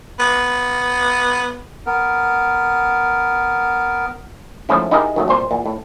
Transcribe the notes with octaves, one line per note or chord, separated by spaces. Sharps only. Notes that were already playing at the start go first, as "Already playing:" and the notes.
B3
B3 A#4
G#2 F3 A3 C#4 E4
D#4 E4 G4 G#4 A#4
D#3 F#3 A3
C2 A#2 C5
E2 A#2
A2